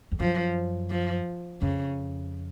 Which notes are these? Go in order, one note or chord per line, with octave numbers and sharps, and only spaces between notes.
F2
F#2 F3
F3
F2 C#3